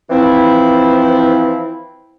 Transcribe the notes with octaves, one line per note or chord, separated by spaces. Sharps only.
E3 F3 C4 E4